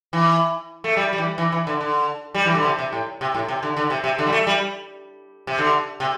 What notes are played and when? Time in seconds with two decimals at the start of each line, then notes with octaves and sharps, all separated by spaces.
0.13 E3
0.84 A3
0.97 G3
1.13 G3
1.18 E3
1.38 E3
1.52 E3
1.67 D3
1.80 D3
2.34 G3
2.45 E3
2.55 D3
2.65 C3
2.79 C3
2.93 A2
3.21 C3
3.34 A2
3.48 C3
3.63 D3
3.77 D3
3.90 C3
4.04 C3
4.19 D3
4.26 G3
4.33 A3
4.47 G3
5.47 C3
5.58 D3
6.00 C3